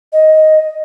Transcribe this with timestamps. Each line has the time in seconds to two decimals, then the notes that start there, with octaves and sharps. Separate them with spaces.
0.13 D#5